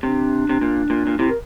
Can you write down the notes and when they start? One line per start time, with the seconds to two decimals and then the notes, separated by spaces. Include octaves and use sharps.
0.03 C3 D4
0.49 C3
0.61 A#2
0.90 A#2
1.07 A#2
1.19 C3 E4
1.30 A#4